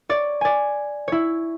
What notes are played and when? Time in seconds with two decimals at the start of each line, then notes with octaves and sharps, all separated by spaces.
0.09 C#5 D5
0.41 D5 G#5
1.08 E4 C#5